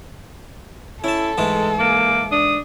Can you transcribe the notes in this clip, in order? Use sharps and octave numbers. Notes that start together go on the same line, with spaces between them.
C#4 E4 A4 A5
G#2 E3 G#3 A3
A#3 D6
D4 D#6